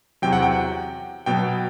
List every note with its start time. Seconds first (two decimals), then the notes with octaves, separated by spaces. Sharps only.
0.22 E2 C3 F#3 G5
0.33 F#5
0.43 G5
1.26 B2 F#3 B3 G5